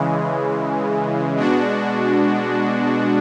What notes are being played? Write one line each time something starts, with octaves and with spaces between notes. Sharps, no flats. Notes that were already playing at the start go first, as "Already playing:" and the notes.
Already playing: C#3 E3 G#3
B2 G#3 D4 F#4